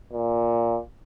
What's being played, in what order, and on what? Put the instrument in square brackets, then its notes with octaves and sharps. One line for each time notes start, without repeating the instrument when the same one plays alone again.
[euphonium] A#2